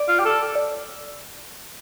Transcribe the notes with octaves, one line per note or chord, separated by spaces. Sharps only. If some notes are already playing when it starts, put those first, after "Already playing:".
Already playing: D5
F4
G4
A4